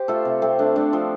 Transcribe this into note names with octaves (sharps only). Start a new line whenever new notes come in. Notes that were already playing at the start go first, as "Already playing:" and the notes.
Already playing: G4 C5
A3 F4 A4
C3
A3 C4
A3 D4
A3 D4
F3 C4